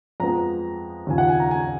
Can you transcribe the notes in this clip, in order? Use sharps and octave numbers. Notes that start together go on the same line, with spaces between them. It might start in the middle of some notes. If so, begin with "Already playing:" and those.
F2 F3 G#3 B3 A#5
D#2 C#3 F3 G#5
F#5
G#5
A#5
G#5